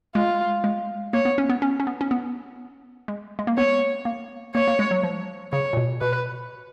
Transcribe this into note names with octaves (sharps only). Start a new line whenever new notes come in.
G#3 F4
G#3
A#3 C#5
B3
C#4
B3
C#4
C#4
B3
C#4
B3
G#3
G#3
A#3
B3 C#5
A#3
A#3 C#5
A#3
G#3
F#3
F3
C#3 C#5
A#2
B2
B2 B4